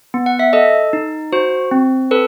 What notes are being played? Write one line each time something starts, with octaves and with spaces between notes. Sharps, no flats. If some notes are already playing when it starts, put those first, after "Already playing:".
B3
F#5
E5
A4 D#5
D#4
F#4 C5
C4
A4 B4